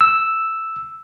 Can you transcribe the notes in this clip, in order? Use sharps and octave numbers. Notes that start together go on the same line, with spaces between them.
E6